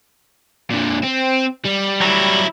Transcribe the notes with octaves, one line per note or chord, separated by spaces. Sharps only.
A#2 D3
C4
G3
F#3 E4